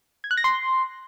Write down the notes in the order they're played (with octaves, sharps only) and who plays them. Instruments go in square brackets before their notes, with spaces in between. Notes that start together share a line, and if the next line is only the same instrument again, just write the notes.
[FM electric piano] G#6
F#6
A#6
C6